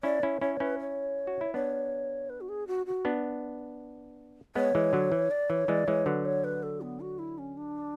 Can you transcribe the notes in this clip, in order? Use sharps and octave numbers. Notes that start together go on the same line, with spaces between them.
C#4 E4 D5
C#4 E4 C#5
C#4 E4 C#5
C#4 E4 B4
C#5
F#4
E4
B3 D4 C#5
B4
F#4
G#4
F#4
F#4
B3 D4
G#3 B3 C#5
E3 G#3
D3 F#3
E3
D5
E3 C#5
E3 G#3 D5
E3 G#3 C#5
D3 F#3 B4
C#5
B4
A4
B3
F#4
E4
C#4
D4